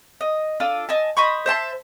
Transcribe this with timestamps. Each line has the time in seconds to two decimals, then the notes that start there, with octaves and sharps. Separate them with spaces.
0.21 D#5
0.60 D4 F4 A4
0.89 D#5 G#5 A5
1.17 C5 D#5 B5 C#6
1.46 C5 E5 A5 C6